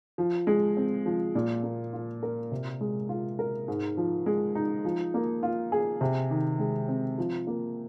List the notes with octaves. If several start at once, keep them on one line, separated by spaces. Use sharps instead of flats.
F3
G#3
C4
F3
A#2
A#3
F4
A#4
C3
G#3
F4
A#4
G#2
F3
G#3
D#4
F3
A#3
F4
G#4
C3
D#3
G#3
C4
F3
A#3